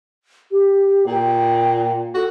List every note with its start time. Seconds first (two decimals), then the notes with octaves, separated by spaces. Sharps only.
0.51 G4
1.07 A#2 G5
2.15 F#4 A4